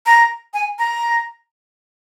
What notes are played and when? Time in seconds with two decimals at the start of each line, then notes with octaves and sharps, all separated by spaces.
0.06 A#5
0.54 G#5
0.79 A#5